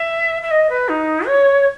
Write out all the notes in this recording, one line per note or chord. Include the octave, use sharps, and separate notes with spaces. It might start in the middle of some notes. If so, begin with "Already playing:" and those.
Already playing: E5
E5
D#5
B4
D#4
C#5